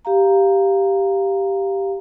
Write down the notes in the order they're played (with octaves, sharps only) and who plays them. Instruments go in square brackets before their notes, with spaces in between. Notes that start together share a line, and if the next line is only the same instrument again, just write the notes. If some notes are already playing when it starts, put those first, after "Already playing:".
[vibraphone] G4 F5 A#5